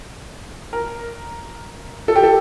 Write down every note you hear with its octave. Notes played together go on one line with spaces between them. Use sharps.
A#4
A4
G4
A4